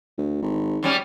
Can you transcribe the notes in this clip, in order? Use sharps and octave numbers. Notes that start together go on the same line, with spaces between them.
D2
G#1
F#2 G3 C#4